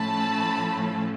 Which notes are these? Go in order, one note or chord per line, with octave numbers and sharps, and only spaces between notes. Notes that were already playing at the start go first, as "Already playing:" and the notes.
Already playing: A2 F3 A3 C#4 A5 B5